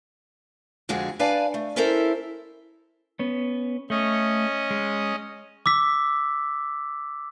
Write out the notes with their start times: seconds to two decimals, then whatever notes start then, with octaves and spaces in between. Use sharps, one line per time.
0.89 F2 D3 G#3 F#4 G#4 F#5
1.19 D4 B4 D5 F5 G#5 A5
1.54 A3
1.76 C#4 E4 A4 A#4 C5 E5
3.19 B3 C#4
3.90 A3 C#4 D#5
4.71 G#3
5.66 D6 E6 B6